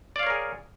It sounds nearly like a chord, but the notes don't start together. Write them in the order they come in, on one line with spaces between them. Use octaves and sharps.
D5 F5 C#5 A#4 G#4